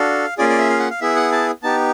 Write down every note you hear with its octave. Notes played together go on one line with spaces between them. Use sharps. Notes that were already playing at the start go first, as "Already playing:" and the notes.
Already playing: D4 F#4 A4 F5
A#3 C#4 F4 G#4 D5
D5
E5
F5
F#5
F5
B3 E4 G#4 E5
F#5
A5
B3 D#4 G4 A5